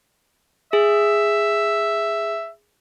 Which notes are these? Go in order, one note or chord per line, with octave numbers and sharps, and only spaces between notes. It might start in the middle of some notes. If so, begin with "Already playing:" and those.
G#4 E5